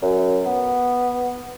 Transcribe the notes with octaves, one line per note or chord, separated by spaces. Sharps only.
F#2
B3